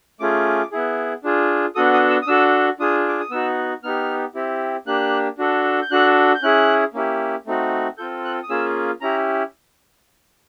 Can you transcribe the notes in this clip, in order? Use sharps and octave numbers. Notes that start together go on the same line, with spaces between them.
A3 C#4 F4 G#4 D6
B3 E4 G#4
D4 F4 G#4
B3 D4 F#4 A4 D#6
D#6
E6
D#6
D4 F#4 A4 E6
D4 F4 G#4 D#6
D6
D#6
B3 D#4 F#4 E6
B3 D#4 G4 F6
C4 E4 G4
A#3 D4 G4 F#6
D4 F#4 A4
G6
D4 F#4 A4 F#6
G6
C#4 E4 G#4 F#6
A#3 C#4 E4 G4
A3 C4 D#4 F#4
C4 F4 A4 G6
F#6
D#6
A#3 C#4 F4 G#4 E6
C#4 E4 G4 A#5